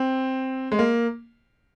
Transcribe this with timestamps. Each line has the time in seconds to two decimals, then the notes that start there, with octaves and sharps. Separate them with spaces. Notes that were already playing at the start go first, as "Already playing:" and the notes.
Already playing: C4
0.72 G#3
0.79 A#3